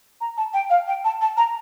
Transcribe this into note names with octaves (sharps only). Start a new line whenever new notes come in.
A#5
A5
G5
F5
G5
A5
A5
A#5